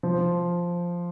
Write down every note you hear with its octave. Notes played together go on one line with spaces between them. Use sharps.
F3